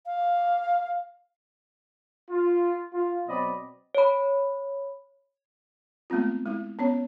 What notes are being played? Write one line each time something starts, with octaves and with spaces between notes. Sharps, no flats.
F5
F4
F4
B2 F#3 C4 D5 D#5 B5
C#5 B5
G#3 A3 B3 C4 F4
G#3 E4
B3 C#4 C#5